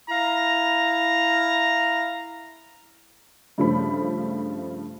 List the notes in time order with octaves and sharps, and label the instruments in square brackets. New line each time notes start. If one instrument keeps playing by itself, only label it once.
[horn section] E4 F5 A#5
[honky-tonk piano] G2 C#3 F3 A3 B5